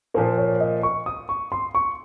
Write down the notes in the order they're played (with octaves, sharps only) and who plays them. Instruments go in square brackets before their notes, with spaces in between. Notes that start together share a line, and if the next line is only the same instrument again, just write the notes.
[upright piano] A#2 F3 A#3 [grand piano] C5
[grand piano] C#5
D#5
C#6
D#6
C#6
C6
C#6